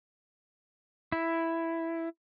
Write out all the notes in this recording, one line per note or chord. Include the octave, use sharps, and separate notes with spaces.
E4